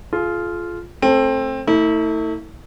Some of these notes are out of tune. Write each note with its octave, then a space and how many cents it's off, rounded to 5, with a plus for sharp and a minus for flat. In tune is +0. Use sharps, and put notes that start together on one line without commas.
F4 -5 G#4 +45
A3 +0 C4 +20 A4 +0
A3 +35 E4 -35